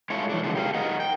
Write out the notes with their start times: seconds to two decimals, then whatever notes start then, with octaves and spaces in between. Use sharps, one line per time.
0.10 G#3 E4 F4 A4 C#5
0.30 E3 D4
0.44 C#3 F#3 G#3 A#3 B3 G#4
0.55 G4 A#4 D5 F5
0.74 A#4 D#5 F#5
1.00 G5